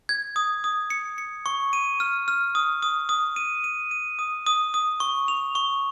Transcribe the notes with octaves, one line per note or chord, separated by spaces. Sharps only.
G#6
D#6
D#6
C#7
C#7
C#6
D#7
F6
F6
D#6
D#6
D#6
D#7
D#7
D#7
D#6
D#6
D#6
C#6
F7
C#6